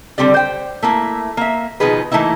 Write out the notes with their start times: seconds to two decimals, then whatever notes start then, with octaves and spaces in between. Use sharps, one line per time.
0.18 D3 G3 C4 G4 D5
0.34 C5 G5
0.82 A3 A#3 E4
1.37 A#3 E5
1.80 B2 D#3 F3 D#4 G#4 B4
2.12 E3 A3 A#3 D#4 E4